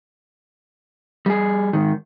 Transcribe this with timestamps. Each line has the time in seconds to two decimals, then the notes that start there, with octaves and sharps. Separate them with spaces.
1.26 G3 G#4
1.73 G#2 D#3